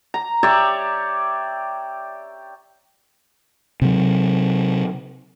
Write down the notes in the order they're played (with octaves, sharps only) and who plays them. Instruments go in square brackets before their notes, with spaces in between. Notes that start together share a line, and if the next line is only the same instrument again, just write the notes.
[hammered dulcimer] A#5
G4 C#5 D5 E5
[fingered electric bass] C3 F#3